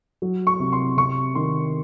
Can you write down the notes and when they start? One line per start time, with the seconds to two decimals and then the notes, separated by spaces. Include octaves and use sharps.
0.22 F#3
0.47 C#6
0.60 C3
0.72 C6
0.97 C3 C#6
1.35 D#3 C6